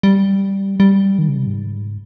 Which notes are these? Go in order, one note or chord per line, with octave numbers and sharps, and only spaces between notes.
G3
G3
D#3
C#3
C3
G#2